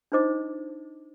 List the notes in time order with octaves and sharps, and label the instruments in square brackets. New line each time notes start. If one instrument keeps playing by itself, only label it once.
[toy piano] D4 D#4 F4 C5 D#5 D6